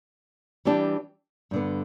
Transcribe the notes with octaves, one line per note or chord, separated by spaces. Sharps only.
E3 G3 D4 G4
G2 D3 B3